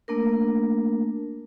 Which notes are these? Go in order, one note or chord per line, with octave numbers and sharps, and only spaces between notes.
A3 A#3 D4 A#4